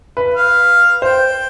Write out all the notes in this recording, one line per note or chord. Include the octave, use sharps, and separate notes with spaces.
B4
F5
C5 G5